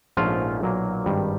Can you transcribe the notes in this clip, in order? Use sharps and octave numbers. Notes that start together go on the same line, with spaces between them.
A#1 G#2 F3 A3 C#4 F4
B1 A#2 F#3 A#3
G#1 G2 D#3 G3